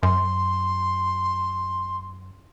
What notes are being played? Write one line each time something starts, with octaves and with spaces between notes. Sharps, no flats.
F#2 C6